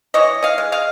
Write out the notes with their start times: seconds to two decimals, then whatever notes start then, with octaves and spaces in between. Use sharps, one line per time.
0.14 E3 C#5 D#5
0.43 D#5 F5
0.58 G#3
0.72 D#5 F5